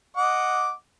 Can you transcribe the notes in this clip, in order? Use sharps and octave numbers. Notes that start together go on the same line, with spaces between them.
D#5 F#5 D6